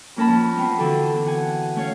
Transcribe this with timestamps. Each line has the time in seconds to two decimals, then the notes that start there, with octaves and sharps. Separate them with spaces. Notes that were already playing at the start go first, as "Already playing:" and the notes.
0.16 F2 A#3 C#4 A#4 A5 B5
0.28 F3
0.57 B3 C4
0.78 D3 E3 D4 F#4 A4
1.26 F#5 G#5
1.76 A3 C#4 C#5 F5